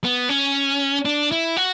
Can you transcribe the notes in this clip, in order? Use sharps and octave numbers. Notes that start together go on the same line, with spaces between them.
B3
C#4
D4
E4
F#4